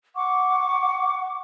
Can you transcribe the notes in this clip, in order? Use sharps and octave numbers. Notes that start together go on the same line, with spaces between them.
F#5 C#6 D6